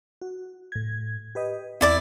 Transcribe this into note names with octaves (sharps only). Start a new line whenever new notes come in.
F#4
A2 G#6
G4 B4 D#5
E2 C4 E4 D5 D6